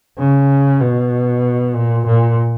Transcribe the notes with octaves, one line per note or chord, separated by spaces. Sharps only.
C#3
B2
A#2
A#2